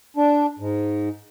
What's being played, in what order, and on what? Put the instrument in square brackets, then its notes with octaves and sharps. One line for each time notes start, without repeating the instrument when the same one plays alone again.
[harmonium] D4
G#2